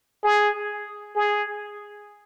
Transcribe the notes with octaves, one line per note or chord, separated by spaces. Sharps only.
G#4
G#4